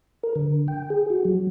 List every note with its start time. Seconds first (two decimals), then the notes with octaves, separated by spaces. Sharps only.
0.23 A#4
0.36 D3
0.68 G5
0.90 G#4
1.10 F#4
1.25 F#3